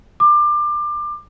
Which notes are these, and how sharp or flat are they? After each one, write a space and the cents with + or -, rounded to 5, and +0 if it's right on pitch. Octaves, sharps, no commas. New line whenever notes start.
D6 +25